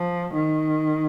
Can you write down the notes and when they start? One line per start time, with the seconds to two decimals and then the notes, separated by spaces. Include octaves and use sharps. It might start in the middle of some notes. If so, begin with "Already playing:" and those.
Already playing: F3
0.34 D#3